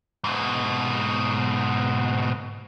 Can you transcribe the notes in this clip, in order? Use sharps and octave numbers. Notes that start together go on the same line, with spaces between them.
G#2 B2